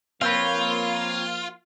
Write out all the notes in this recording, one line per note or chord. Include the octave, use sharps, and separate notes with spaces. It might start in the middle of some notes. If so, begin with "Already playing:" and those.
F3 A#3 C4 F4 B4 C#5 F5